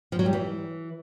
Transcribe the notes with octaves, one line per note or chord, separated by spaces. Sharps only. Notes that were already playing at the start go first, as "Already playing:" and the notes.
F3
F#3
G3
E3